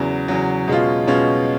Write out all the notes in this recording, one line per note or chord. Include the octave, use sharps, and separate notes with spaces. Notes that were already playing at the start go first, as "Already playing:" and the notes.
Already playing: E2 C#3 F#3
E2 C#3 F#3
B2 G#3 C#4 F4
B2 G#3 C#4 F4